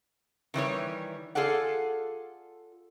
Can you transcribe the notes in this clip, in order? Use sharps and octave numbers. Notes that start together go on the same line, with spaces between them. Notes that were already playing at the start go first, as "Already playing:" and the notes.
D#3 E3 G3 C#5
F4 G#4 A4 D5 F#5